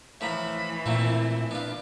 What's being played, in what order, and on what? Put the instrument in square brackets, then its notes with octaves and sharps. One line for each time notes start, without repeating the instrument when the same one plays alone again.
[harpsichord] A2 F3 A#5 [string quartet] E3 [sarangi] B5
[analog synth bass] A#2 [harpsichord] A3 A#3 C4 [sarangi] E4
[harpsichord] B3 F4 [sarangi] D4